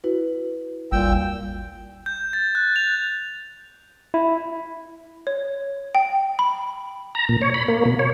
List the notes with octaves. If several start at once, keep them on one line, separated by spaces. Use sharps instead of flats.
E4 F#4 B4
G#1 D#2 A#2 G3 G5 E6
G6
A6
F#6
F7
E4
C#5
G5
B5
A#5
A#2
C#5
B5
A#3
B2
C#5